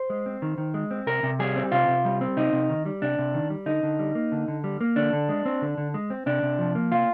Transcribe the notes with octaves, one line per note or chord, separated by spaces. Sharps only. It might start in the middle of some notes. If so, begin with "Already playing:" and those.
Already playing: C5
G#3
C4
D#3
D#3
G#3
C4
C3 A#4
C3
G3 G#4
C4
C3 F4
C3
G3
C4
C3 D#4
C3
D#3
G3
C3 D4
C3
D#3
G3
D3 D#4
D3
G3
A#3
D3
D3
G3
A#3
D3 D4
D3
G#3
C4
D3
D3
G#3
C4
C3 D4
C3
F3
A#3
C3 F4